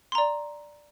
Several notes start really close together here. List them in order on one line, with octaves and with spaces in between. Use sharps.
C6 A#5 D5